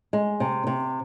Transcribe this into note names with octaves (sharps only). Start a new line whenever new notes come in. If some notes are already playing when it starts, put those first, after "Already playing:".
G#3
C3
C3